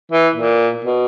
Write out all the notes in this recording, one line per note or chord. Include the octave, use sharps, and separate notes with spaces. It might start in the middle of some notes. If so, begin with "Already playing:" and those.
E3
A#2
B2